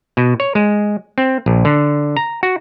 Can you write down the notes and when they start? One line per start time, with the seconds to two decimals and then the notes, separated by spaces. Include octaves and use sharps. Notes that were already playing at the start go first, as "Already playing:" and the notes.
0.17 B2
0.40 C#5
0.55 G#3
1.18 C4
1.46 A#1
1.65 D3
2.17 A#5
2.43 F#4